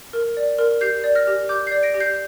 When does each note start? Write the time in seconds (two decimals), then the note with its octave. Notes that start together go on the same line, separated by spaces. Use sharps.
0.13 A#4
0.37 D5
0.59 A#4
0.81 G4 G6 C7
1.04 D5
1.15 F6 A#6
1.27 G4
1.49 G4 D6 G6
1.67 D5 G6 C7
1.83 A#6 D7
1.94 G4
2.00 G6 C7